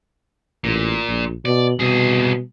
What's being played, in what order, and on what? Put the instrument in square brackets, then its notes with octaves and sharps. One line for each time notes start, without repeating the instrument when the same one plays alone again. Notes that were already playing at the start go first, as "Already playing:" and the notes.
[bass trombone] A1 [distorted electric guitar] A#2
[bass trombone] A#1
[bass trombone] B2 [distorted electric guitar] D5
[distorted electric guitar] C2 G#4 [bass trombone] B2